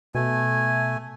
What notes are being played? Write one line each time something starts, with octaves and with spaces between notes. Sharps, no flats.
B2 A3 G#5